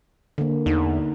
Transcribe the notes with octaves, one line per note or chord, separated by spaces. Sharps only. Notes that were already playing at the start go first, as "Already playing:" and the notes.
D3 A#3
E2 D#4